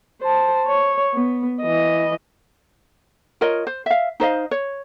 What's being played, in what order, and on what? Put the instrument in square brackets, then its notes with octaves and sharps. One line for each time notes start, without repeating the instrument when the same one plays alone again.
[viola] C5 A5
C#5
B3
E3 D#5
[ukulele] F4 A#4 C#5 D#5
C5
E5 F5
D#4 C5 D#5 F5
C#5